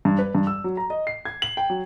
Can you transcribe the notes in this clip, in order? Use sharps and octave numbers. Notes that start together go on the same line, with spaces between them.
G2
B4
G2
E6
F#3
A#5
D#5
C7
G#6
F#7
G5
F#3